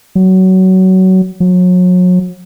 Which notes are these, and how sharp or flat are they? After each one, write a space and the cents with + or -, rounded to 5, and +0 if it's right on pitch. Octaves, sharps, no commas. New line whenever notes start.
F#3 +20
F#3 -35